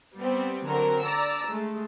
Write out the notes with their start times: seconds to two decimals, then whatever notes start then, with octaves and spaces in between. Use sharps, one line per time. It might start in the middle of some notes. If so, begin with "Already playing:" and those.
0.16 G3 B3 C4
0.65 D3 F#3 C4 A#4
1.02 D5 A#5 E6
1.48 G#3 A3